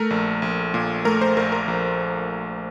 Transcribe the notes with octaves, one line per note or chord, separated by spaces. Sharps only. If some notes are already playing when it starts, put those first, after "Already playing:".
Already playing: A3 A#4
A#1
A#1
A#2
A3 A#4
C5
A#1 A#4
A#4
A#1